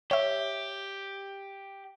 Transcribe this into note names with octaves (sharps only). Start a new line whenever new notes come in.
G4 C#5 E5